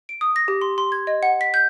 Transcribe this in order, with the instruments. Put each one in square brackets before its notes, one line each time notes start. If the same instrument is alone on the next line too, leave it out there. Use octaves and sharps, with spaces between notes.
[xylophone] D7
D#6
A#6
G4
C6
C6
G#6
D#5
F#5
B6
G6